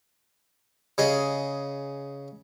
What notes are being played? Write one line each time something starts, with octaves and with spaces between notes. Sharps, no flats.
C#3 G#4 D#5